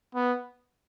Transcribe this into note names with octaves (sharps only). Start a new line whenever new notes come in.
B3